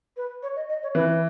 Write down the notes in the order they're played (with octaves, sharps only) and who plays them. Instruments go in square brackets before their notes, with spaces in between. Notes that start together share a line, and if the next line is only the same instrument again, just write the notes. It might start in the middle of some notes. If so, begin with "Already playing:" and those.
[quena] B4
C#5
D#5
D#5
C#5
[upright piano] E3 [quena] B4